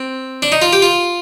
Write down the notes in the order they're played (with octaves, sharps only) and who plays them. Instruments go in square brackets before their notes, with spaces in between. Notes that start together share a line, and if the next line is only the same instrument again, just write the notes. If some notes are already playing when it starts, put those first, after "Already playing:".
Already playing: [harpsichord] C4
D4
D#4
F4
G4
F4